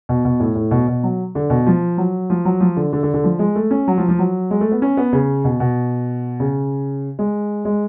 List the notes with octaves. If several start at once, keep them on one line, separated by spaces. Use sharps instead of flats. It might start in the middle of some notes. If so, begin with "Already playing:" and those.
B2
B2
A2
A2
B2
B2
F#3
D3
B2
F3
F#3
F3
F#3
F3
D3
D3
D3
D3
F3
G#3
A3
C#4
F#3
F3
F3
F#3
G#3
A3
B3
C#4
B3
C#3
B2
B2
C#3
G#3
G#3